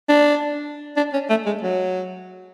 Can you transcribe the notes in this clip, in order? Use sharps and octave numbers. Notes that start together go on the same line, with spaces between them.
D4
D4
C#4
A3
G#3
F#3